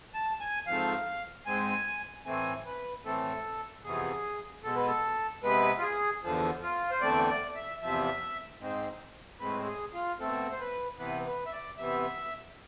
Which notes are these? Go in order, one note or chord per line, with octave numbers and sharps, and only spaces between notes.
A5
G#5
G#2 F3 A3 C4 F5
G#2 G#3 C4 G#5
A2 E3 A3 C4 G#5
B4
A2 E3 A3 C4 A4
F2 C3 E3 B3 G#4
B2 G#3 B3 A4
B4
A4
C3 G#3 B3 B4
F4
G#4
E2 D3 F3
F4
C5
E2 D3 A3 C4 D5
D5
E5
E2 C3 F3 E5
G#2 G#3 C4
A2 G#3 C4 B4
G#4
F4
B2 A3 C4 A4
C5
B4
C3 E3 B3 B4
B4
E5
D5
C3 E3 B3 E5